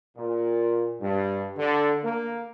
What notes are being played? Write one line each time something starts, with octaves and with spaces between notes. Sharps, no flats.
A#2
G2
D3
A#3